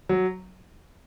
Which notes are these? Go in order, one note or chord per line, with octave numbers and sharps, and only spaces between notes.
F#3